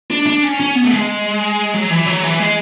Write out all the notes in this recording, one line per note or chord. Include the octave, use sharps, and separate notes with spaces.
D4
D4
C#4
C#4
B3
A3
G#3
F#3
E3
F#3
E3
G#3